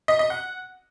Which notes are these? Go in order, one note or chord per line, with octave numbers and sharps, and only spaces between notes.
D#5
D#5
F#5